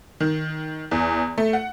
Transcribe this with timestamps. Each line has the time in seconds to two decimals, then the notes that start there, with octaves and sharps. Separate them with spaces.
0.20 D#3
0.91 E2
1.38 A3
1.53 F#5